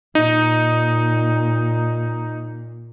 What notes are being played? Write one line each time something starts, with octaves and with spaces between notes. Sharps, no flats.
A#2 D#4